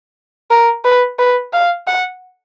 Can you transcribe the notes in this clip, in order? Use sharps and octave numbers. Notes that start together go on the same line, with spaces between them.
A#4
B4
B4
F5
F#5